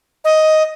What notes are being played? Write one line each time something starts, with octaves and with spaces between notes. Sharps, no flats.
D#5